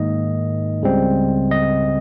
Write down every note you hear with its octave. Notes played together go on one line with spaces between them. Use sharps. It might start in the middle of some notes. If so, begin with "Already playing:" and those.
Already playing: G#2 D#3 A#3 D#5
C#2 C#3 G3 C4
D#5